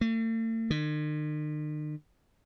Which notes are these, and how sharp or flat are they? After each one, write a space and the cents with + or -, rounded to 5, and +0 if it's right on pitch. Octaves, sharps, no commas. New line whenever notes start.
A3 +45
D#3 -45